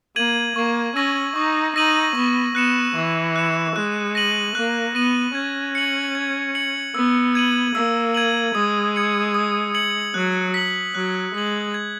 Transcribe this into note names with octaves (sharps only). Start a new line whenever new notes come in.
A#3 G#6 D#7 F#7
A#3 C#6
C#4 E6 A#6 D#7 F#7
D#4 C#6
D#4 E6 A#6 D#7 F#7
B3 C#6
B3 F#6 C#7 E7
E3 C#6
F#6 C#7 E7
G#3 F#6
A#6 D#7 F#7
A#3 F#6
B3 A#6 D#7 F#7
C#4 G#6
C#7 F#7
G#6
C#7 F#7
B3 E6
G#6 D#7 F#7
A#3 E6
G#6 D#7 F#7
G#3 D#6
G#6 C#7 F#7
D#6
G#6 C#7 F#7
F#3 F#6
B6 F#7
F#3 F#6
G#3 B6 F#7
G#6